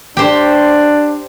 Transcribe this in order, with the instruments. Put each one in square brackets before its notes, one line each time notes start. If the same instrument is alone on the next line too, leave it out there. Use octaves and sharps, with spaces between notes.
[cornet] D4 [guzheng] G4 C5